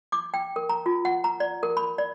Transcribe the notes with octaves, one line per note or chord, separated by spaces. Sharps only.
D6
G5
A#4
A#5
F4
F#5
A#5
D5
A#4
B5
D5